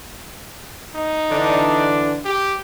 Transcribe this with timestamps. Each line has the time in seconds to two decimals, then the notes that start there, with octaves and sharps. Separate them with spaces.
0.95 D#4
1.30 D3 E3 D4
2.25 G4